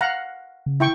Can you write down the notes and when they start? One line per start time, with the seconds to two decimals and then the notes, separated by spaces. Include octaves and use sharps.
0.01 F5 F#5 A#5
0.66 C#3
0.80 E4 G5 C#6